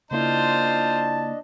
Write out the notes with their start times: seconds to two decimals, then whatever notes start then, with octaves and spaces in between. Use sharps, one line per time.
0.11 C#3 A#3 D4 E4 F4 C5 D#5 A5